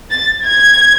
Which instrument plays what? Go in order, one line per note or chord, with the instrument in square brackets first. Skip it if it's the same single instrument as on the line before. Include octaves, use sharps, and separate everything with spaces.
[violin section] A6
G#6